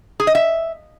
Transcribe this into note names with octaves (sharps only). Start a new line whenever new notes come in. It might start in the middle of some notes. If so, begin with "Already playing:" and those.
G#4
D#5
E5